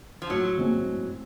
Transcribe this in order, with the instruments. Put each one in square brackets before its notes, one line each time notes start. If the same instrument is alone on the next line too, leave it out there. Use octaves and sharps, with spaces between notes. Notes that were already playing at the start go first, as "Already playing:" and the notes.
[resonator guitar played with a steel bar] F3
[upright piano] A2 [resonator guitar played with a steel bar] F#3
[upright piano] F3 G#3 C4
A2